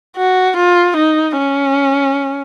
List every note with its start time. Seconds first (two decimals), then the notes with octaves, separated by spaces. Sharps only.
0.17 F#4
0.56 F4
0.96 D#4
1.37 C#4